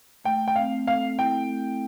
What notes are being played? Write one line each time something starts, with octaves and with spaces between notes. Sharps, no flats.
A3 G5
G5
C4 F5
A4 F5
E4 G5
A3